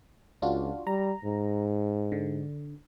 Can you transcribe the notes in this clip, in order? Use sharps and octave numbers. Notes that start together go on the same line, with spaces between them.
C#2 D4 F4 F#4
G3 A#5
G#2
D3